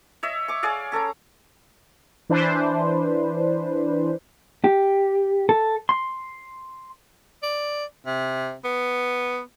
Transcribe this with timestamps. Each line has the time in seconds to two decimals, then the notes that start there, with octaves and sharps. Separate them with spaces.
0.23 C#5 D#5 E5
0.48 C#6 D6
0.63 G#4 C#5 D5 F5
0.92 C#4 A4 C#5 A#5
2.29 E3 D4 B4 C5
4.64 G4
5.49 A4
5.89 C6
7.43 D5
8.06 C3
8.64 B3